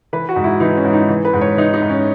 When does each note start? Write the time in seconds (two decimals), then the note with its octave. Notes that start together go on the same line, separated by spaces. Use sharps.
0.13 E3 B4
0.29 F#4
0.36 G#2
0.44 E4
0.60 E3 D#4
0.77 C#4
0.84 G#2
0.93 D#4
1.09 E3
1.25 B4
1.33 G#2
1.41 C#5
1.57 E3 D#4
1.74 D#4
1.82 G#2
1.90 C#4